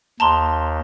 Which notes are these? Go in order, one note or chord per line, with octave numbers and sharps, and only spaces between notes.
D#2 A5 A#5 C6